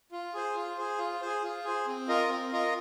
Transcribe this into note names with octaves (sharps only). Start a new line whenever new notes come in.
F4
G#4 C5
F4
G#4 C5
F4
G#4 C5
F4
G#4 C5
C4
F4 A#4 D#5
C4
F4 A#4 D#5